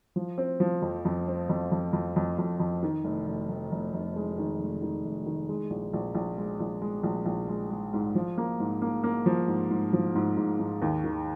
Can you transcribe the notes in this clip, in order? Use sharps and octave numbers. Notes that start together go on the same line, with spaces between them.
F3
C4
F3
F2
F2
C4
F2
F2
F2
F2
F2
F2
D#3
F1
F1
F1
F1
F1
G#3
D#3
F1
D#3
F1
D#3
G#3
A#1
A#1
A#1
G#3
A#1
G#3
A#1
A#1
G#3
G#3
G#2
F3
A#3
G#2
A#3
A#3
F3
G#2
G#2
F3
G#2
G#2
G#2
D#2
D#3